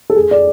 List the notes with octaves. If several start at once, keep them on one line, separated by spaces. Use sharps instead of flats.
A4
G#4
D5